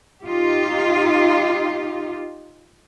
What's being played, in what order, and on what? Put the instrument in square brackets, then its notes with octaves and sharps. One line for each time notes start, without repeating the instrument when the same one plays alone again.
[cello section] D#4 F4 G4